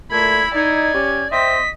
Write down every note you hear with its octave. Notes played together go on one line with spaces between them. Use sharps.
A#2 A3 E4 B5 G#6
D#4 D5 G#6
C#4 G4
C4 D#5 E5 B6